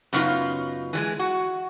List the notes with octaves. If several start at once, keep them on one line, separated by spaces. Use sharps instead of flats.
F#2 C#3 B3 D#4 F4 F5
E3 G3 G#3
F#4